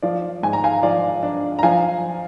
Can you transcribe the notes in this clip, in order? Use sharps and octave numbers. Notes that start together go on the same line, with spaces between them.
F3 D5 F5
G#2 G#5
A#5
F5 G#5
F3 D5 F5
D4
A#5
F3 F5 G#5